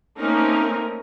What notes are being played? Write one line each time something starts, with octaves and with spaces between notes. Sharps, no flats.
A3 A#3 C4 C#4 D#4 A#4